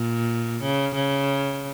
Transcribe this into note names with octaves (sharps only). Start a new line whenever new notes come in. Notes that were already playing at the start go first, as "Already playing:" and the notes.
Already playing: A#2
C#3
C#3